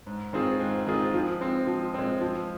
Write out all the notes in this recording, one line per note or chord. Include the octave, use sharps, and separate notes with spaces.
G#2
D#3 C4 F4 G#4
G#2
D#3 C4 F4 G#4
F3
G#3 C4
F3
G#3 C4
F3